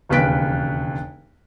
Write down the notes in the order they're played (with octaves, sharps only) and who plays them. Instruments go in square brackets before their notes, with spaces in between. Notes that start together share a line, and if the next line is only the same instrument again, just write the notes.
[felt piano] E1 D#2 C#3 B4 B6 D7